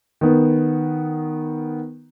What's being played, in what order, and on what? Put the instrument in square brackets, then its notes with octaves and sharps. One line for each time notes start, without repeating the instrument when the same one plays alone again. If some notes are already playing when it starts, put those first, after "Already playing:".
[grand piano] D#3 B3